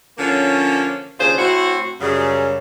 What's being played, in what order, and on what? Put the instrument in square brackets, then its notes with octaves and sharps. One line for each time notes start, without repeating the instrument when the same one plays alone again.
[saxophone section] D3 F3 A#3 C#4
D#2 C#3 D4 F4 G#4 C5
A2 C4 E4 F#4
F#2 C#3 G3